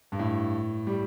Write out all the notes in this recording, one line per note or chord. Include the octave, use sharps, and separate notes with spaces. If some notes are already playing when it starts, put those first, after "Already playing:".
G2
A2
G3